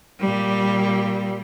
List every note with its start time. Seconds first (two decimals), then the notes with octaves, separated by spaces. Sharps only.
0.20 A#2 G3